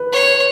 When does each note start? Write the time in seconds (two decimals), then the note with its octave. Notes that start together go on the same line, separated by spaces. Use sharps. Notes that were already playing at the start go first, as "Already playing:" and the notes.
Already playing: B4
0.13 C#5